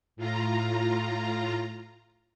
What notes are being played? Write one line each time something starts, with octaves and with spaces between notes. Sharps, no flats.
A2 F4 A#5